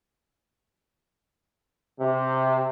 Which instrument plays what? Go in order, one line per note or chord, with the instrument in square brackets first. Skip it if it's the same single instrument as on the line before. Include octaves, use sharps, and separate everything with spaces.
[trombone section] C3